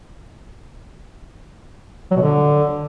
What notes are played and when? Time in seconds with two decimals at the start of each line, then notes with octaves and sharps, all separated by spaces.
2.11 F#3
2.16 B2
2.22 D3